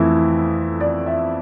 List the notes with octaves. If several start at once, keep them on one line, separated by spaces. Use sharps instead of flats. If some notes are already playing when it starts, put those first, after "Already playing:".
Already playing: F2 E3 A3 E4
D5
E5